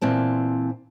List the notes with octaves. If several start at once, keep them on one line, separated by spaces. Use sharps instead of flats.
A#2 E3 C4 A5